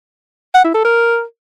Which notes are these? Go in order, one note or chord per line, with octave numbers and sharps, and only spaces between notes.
F#5
E4
A4
A#4